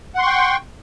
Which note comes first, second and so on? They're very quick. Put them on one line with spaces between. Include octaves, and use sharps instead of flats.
F#5 C6 C#6 G5